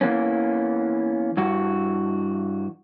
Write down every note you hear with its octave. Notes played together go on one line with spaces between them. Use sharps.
E3 A#3 B3 C#4
G2 E3 F#4